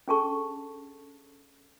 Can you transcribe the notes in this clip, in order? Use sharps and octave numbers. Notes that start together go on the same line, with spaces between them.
C#4 D4 G#4 A4 A5 C#6